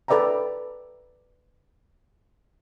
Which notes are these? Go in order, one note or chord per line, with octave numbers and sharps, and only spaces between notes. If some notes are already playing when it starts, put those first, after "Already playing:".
A4 B4 D5 E5 G5 A#5